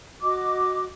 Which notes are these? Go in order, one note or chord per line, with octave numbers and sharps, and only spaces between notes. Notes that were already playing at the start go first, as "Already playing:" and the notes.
F#4 D#5 D6